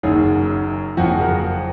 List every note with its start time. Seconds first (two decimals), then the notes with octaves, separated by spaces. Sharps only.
0.03 F#1 F#2 D#3 F#3 G#4
0.97 F#1 F2 F3 F#4
1.09 G#4
1.21 A#4